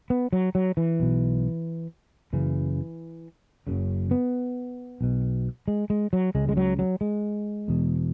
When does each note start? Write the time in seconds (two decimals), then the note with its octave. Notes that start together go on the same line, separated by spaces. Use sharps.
0.10 B3
0.33 F#3
0.55 F#3
0.77 E3
1.00 B1 B2
2.33 F#1 F#2 C#3 E3
3.67 F#1 F#2 C#3
4.11 B3
5.01 B1 B2
5.68 G#3
5.90 G#3
6.13 F#3
6.35 C#2 C#3 G#3
6.49 G#3
6.57 F#3
6.79 F#3
7.01 G#3
7.68 E1 E2 B2